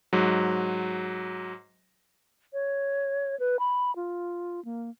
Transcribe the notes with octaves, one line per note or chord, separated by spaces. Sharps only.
G#2 F#3
C#5
B4
B5
F4
A#3